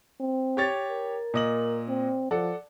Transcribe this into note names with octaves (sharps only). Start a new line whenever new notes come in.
C4
G4 C#5 A6
A#4
A#2 D#5 F#7
C4
F3 A4 D5 F#5